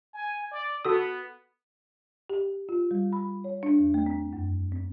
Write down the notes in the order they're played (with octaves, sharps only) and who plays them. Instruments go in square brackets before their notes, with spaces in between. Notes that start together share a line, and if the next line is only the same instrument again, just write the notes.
[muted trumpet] G#5
D5
[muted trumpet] B3 [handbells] F#4 A4 D#6
[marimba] G4
F4
G3
B5
C#5
D4
E2
A3
C4
F#2
C4